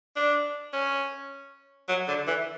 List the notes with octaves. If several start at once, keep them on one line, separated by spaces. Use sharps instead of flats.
D4
C#4
F#3
D3
E3